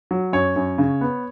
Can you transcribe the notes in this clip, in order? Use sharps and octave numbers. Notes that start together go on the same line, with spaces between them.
F#3
F#2 C#5
F#2
C#3
B3